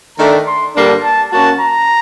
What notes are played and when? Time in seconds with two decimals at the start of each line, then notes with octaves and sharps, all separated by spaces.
0.18 D#3 A3 D4 A#5
0.47 C6
0.76 G2 D3 G3 A#3 D4
1.04 A5
1.32 F#2 F#3 A#3 F#4 A5
1.60 A#5